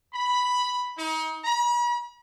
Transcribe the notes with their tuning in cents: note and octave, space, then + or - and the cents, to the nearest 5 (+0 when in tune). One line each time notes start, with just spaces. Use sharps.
B5 +0
D#4 +35
B5 -45